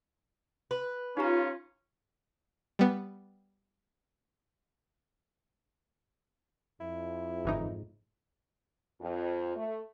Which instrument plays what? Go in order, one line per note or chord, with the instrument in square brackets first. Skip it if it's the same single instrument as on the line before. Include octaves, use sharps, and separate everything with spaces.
[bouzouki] B4
[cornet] C#4 [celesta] D#4 G4 A#5 [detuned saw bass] F4
[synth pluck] G3 B3
[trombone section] F2 [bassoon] E4
[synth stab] G1 E3 D#4 [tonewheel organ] G#2
[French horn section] F2
A3